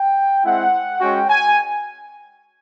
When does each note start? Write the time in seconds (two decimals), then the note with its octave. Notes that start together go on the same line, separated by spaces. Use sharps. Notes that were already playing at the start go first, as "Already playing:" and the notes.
Already playing: G5
0.45 G#3 C4 E4 F#5
1.01 G#3 C#4 F#4 G5
1.30 G#5